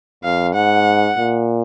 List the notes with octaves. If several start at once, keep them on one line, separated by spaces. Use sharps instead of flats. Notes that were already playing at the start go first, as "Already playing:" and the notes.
F2 F5
G#2 F#5
A#2